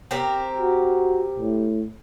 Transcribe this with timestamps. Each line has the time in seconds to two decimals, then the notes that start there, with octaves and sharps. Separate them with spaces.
0.11 C4 G4 A#4
0.58 F#4
1.39 A2